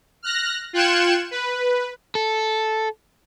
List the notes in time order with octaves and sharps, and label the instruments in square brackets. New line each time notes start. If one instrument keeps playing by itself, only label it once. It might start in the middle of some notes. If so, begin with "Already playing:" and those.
[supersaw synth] F6 F#6 A#6
F4 G5 F#6 G#6 C#7 E7
B4
[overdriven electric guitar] A4